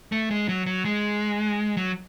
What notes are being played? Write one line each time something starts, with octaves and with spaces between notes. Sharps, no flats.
A3
G#3
F#3
F#3
G#3
F#3